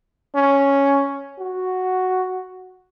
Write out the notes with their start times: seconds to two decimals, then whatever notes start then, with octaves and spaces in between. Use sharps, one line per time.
0.35 C#4
1.39 F#4